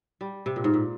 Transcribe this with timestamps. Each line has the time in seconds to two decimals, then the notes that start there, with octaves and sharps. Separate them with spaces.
0.21 G3
0.46 C3
0.56 A#2
0.64 G#2
0.74 A#2